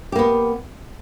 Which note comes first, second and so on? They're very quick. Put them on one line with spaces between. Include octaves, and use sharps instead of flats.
G4 A#3 B3